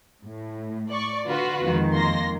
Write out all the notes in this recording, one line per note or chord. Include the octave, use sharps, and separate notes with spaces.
A2
D5 C#6
D3 F4 F#4 B4
F2 D#3 G#3
A#3 C6 A#6